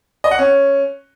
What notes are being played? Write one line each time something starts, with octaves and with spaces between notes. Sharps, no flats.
D#5
F#5
C#4